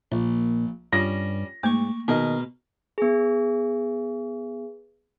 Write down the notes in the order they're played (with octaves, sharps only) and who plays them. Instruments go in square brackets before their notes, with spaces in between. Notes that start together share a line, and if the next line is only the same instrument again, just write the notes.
[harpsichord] A#1 [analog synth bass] A#2
[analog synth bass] G2 [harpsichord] G3 C#4 [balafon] F4 [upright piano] A#6
[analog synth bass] G#2 [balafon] A3 A#3 [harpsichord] C#6 D6
[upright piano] B2 [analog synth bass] D#3 [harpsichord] G#4 A#4 D#5
[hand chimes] B3 G#4